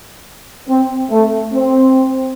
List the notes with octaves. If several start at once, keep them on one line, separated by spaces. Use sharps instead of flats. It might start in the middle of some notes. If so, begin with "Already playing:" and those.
C4
A3
C4